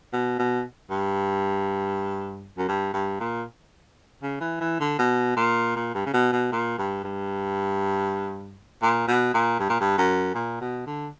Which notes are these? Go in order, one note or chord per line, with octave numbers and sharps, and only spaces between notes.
B2
B2
G2
F#2
G2
G2
A#2
C#3
E3
E3
D3
B2
A#2
A#2
G2
C#3
B2
B2
A#2
G2
G2
A#2
B2
A#2
G2
A#2
G2
F#2
A#2
B2
D3